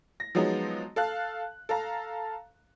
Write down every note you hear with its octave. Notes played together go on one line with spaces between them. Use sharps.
A#6
F3 F#3 G#3 B3 D#4
A4 F5 F#6
A4 F5 A#5